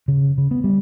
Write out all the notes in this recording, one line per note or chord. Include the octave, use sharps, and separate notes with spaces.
C#3
C#3
B3
G3